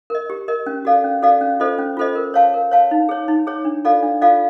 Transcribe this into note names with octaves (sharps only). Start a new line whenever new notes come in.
A#4 D#5
G4
A#4 D#5
C#4
F#4 A4 D5 F5
C#4
F#4 A4 D5 F5
C#4
F4 A4 C5 D#5
C#4
F4 A4 C5 D#5
A#4
C#5 F5 A5
A#4
C#5 F5 A5
D#4
G#4 C#5
D#4
G#4 C#5
D4
F4 A4 D5 F5
D4
F4 A4 D5 F5